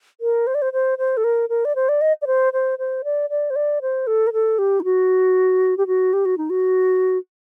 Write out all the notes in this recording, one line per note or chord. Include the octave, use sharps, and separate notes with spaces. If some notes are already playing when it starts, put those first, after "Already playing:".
A#4
C5
D5
C5
C5
C5
A4
A#4
A#4
D5
C5
D5
D#5
D5
C5
C5
C5
D5
D5
C5
D5
C5
A4
A#4
A4
G4
D#4
F#4
G4
F#4
G4
F#4
D#4
F#4